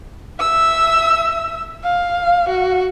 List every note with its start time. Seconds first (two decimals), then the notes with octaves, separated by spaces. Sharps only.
0.39 E5 E6
1.84 F5
2.49 F#4